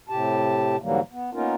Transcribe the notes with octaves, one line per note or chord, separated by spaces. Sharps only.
A2 C3 G4 A5
G#2 D3 E3 F#3 G3 A#3
B3
A#3 B3 C#4 D#4 F4 A#4